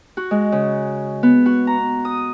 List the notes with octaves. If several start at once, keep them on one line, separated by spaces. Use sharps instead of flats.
F#4
G#3
C#3
B3
F#4
A#5
D#6